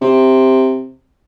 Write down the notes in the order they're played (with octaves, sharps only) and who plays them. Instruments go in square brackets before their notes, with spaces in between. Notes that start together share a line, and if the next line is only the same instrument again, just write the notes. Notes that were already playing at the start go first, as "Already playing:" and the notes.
[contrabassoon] C3